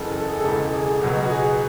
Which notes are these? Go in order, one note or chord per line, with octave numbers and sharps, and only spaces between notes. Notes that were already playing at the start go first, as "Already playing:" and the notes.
Already playing: F#1 E2 C#3 A4
A4
G#4
A4
E1 E2 C#3 G#3
A4
G#4
C#2 B2 F#3
F#4
G#4